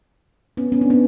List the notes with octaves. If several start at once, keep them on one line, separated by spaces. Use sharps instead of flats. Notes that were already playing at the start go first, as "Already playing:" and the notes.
B3 C#4
B3 C#4
C4 D4
B3 C#4